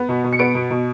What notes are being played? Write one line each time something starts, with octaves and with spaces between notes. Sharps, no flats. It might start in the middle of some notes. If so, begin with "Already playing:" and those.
Already playing: B3
B2
B2
C#7
B3 D7
B2
B2